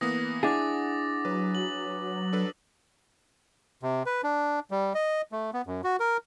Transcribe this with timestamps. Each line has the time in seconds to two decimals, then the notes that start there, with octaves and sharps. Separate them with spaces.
0.01 E3 A#3 B3 D#6 A#6
0.43 D4 E4 G#4 F#5 D6 A6
1.25 F#3 B4
1.55 F#7
2.33 D4 A4 B4
3.83 C3
4.06 B4
4.24 D4
4.71 G3
4.95 D#5
5.32 A3
5.53 B3
5.67 F#2
5.84 F#4
6.00 A#4